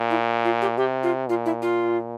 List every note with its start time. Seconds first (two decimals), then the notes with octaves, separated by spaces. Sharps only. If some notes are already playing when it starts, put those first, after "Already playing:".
Already playing: A#2
0.10 E4
0.45 F4
0.61 G4
0.77 C3 G4
1.03 F4
1.29 A#2 F4
1.46 E4
1.62 F4